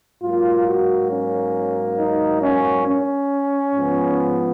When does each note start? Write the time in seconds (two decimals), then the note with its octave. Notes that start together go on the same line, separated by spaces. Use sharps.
0.22 G#2 F#3 A#3 F4
0.66 F#4
1.10 C#4
1.98 D#4
2.43 C#4
2.87 C#4
3.74 G#2 F3 B3